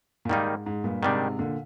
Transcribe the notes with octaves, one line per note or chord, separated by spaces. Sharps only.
A#2
G#2 D#3 G3 A#3 D#4
G#2
G2 A#2
G#2 C3 D#3 G3 D4
A#2 D3